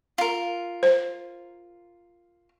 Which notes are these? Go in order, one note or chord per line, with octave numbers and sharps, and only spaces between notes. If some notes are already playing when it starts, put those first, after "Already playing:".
F4 A#4
C5